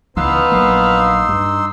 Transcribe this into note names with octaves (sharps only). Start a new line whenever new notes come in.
C#2 E3 B3 D#4 F5 C6 E6
A#1 F#3 A#3
G2